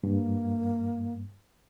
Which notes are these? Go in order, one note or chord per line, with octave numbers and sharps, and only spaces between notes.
G2 A#3